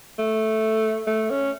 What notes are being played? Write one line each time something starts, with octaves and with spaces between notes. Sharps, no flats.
A3
A3
C#4